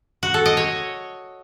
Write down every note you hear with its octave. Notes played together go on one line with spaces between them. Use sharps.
F#4
A4
D#5
C#5